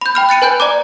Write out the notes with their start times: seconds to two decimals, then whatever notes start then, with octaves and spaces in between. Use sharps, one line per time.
0.01 B5 G6
0.15 G5 B5 F6
0.29 F#6 A6 C#7 D#7
0.42 B4 G#5 F#6 G6
0.60 D5 A#5 D6